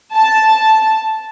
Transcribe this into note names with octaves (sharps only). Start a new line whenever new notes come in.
A5